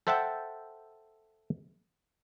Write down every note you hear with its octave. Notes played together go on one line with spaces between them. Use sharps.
A4 C5 E5 F#5 G5 A5